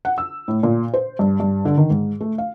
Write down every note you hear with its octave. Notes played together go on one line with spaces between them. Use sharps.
F#5
E6
A2
A#2
C5
G2
G2
D3
D#3
G#2
A3
F5